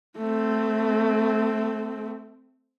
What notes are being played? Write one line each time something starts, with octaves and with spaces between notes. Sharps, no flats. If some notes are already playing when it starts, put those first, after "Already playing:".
A3 C4